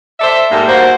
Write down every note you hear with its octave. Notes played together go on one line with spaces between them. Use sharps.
A4 C5 D5 E5
G#2 G3 A3 A#3
A#3 F#4 C5